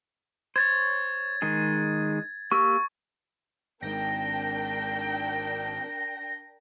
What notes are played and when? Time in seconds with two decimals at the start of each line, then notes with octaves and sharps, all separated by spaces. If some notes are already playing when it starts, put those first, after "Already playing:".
0.56 C5 C#5 G#6 A6
1.42 D#3 G#3 G#4
2.52 A#3 G4 C#6 E6
3.83 G#1 G#2 D4 A#4 G5 A#6